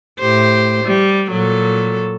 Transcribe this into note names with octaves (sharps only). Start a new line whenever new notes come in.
A2 G4 C5
G3
A#2 F#3 A4